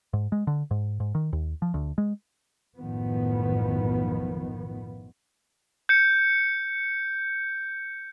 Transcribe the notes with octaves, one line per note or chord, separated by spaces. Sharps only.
G#2
G#3
D3
G#2
G#2
D#3
D#2
F3
D2
G#3
B1 F#2 A2 D#3 F3 B3
G6 C#7